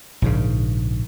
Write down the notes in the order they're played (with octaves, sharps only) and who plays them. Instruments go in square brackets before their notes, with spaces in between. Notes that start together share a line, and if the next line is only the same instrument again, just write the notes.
[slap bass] A#1 G#2 C#3